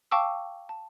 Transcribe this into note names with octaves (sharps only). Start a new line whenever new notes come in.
F5 G5 A5 C#6 D6 E6
A5